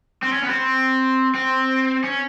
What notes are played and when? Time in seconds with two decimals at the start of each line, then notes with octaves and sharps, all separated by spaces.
0.23 C4
0.32 C#4
0.43 B3
0.50 C4
1.34 C4
2.04 C#4